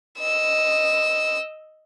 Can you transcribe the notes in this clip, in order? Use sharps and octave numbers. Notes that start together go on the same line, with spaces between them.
D#5 E6